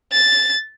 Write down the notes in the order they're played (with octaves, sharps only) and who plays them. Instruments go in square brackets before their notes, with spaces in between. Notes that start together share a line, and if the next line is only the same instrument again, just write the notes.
[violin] A6